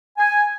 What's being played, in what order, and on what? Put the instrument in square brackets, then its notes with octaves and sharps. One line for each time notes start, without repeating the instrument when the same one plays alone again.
[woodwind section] G#5